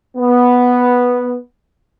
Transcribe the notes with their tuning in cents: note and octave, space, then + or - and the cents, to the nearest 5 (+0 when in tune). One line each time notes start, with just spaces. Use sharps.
B3 -5